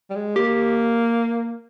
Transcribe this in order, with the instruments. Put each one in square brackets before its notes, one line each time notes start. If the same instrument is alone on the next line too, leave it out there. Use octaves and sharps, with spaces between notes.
[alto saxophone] G3
G#3
[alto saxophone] A#3 [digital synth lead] G4